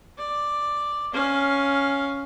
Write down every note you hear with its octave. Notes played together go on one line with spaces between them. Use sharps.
D5
C#4 F5